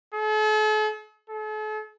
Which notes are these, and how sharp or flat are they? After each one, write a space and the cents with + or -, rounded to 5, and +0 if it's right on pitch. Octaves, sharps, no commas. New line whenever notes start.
A4 -45
A4 -45